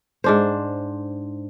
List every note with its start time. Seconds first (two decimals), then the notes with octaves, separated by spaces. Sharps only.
0.24 G#2 D4 C5